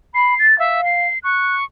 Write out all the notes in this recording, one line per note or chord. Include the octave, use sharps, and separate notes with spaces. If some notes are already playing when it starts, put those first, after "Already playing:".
B5 C7
A6
E5 F5
C7
C#6 F#6